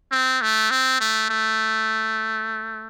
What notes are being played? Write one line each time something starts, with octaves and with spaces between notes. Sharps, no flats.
C4
A3
C4
A3
A3